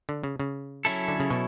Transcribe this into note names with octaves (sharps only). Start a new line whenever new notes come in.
D3
C#3
C#3
F#3 C#4 E4 A4
D3
C#3
B2